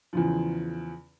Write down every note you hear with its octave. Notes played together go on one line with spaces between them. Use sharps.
E2 C#3 F3